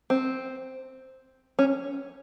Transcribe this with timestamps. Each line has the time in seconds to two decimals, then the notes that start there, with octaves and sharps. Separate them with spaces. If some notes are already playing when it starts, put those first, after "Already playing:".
0.10 C4
1.59 C#4